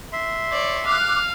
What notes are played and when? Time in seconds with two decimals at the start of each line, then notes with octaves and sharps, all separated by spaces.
0.13 E5 C6
0.52 C#5 D5
0.86 F5 D6 F6 F#6